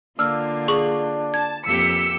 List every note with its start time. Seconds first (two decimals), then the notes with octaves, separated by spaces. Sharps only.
0.19 D3 A#3 D4 F4 E6 F6
0.68 G#4 C#6 F#7
1.34 A5 G#6
1.66 F2 A#3 G4 E6 B6 C#7